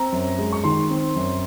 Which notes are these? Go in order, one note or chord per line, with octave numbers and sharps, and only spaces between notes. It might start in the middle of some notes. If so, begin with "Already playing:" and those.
Already playing: C4 A#5
F#2
G#3
C#6
D#3 C6
C4
F#2